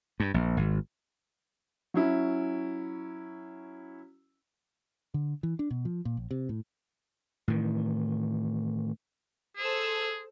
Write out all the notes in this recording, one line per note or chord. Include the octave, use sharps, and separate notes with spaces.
G2
A#1
G#1
F#3 C#4 E4
D3
E3
D4
B2
F3
A#2
A#1
C3
A2
A2 D#3 E3
G#4 A4 C5 E6